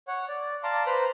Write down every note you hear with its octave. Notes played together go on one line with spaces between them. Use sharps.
C#5 F#5
D5
D5 F5 A5 A#5 C6 D6
B4 C5 A#5 B5